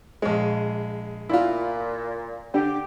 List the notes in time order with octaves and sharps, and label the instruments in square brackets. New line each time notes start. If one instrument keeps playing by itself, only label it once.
[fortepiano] A#1 G#3
[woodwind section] A#2 [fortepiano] E4 F4
[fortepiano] D3 [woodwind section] G4